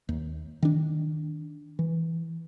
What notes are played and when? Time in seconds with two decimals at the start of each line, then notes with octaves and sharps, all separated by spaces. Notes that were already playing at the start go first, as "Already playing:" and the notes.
0.09 D#2
0.63 D#3 D4
1.79 E3